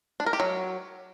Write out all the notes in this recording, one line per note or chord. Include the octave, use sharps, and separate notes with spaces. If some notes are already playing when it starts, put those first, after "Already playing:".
D4
A#4
G4
F#3